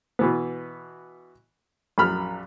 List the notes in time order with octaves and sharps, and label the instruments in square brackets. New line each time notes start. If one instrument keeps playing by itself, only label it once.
[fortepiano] B2 E3 B3
A#1 F#2 B5 F6